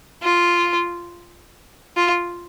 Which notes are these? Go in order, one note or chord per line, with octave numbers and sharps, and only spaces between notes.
F4
F4